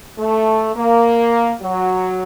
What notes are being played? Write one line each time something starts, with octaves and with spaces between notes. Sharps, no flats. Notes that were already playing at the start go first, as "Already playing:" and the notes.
A3
A#3
F#3